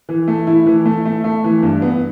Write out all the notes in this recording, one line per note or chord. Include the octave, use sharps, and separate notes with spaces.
E3
A3
E4
E3
A3
A3
A3
E3
G2
B3